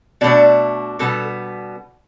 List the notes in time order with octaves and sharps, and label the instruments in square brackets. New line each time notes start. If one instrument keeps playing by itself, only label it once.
[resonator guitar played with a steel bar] B2 A3 D4 D5
B2 G3 B3 A4